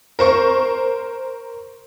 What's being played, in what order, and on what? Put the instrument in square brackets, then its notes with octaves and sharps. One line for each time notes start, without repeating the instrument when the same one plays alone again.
[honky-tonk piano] A#4 C5 C#6